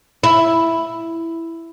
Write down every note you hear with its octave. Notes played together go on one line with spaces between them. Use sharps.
E4